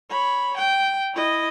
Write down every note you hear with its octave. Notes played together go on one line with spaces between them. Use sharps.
C#5 B5
G5
E4 D#5